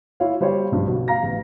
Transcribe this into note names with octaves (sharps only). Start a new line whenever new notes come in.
E4 F4 C#5 F5
G3 C5 C#5
B1 G2 F3
B2
F5 A#5 A#6
A1